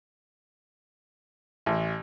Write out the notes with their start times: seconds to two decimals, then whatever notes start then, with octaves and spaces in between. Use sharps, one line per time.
1.66 A1